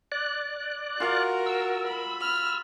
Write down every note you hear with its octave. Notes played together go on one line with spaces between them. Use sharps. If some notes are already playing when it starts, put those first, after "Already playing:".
D5 F#6
F4 F#4 A#4 F5
E6
B5
F6